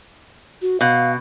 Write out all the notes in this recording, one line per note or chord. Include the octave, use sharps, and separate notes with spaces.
F#4
B2 F5